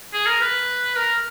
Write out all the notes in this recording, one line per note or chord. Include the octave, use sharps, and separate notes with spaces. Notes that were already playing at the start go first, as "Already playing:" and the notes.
G#4
A#4
B4
A#4